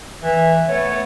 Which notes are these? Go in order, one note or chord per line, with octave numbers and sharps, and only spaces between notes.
E3 E5
A3 B3 C#5